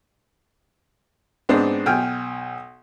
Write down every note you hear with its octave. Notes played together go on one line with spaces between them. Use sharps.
G#2 B3 C4 D4 C5
B1 G5 G#5 F6